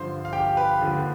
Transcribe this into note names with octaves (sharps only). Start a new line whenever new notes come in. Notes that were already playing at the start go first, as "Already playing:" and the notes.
Already playing: G2 D3 F3 C5 C6
F5
G4 G5
B4
D#2 D3 F3